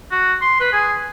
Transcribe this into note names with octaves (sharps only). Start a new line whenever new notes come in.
F#4
C6
B4
G#4